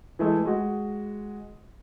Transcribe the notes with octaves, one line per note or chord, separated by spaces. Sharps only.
E3 G#3 A3
G#3 F#4